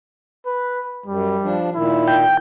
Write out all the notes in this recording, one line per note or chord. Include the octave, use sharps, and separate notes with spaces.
B4
F#2 G3
F3 D4
A#2 D#3 E4
G5